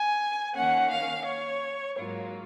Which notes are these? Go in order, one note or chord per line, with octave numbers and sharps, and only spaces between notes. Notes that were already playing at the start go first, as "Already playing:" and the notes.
Already playing: G#5
D#3 A#3 C#4 F#5
F5
C#5
G#2 F#3 A#3 F4